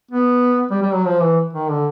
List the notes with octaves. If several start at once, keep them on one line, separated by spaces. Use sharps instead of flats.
B3
G3
G3
F#3
F3
E3
D#3
D3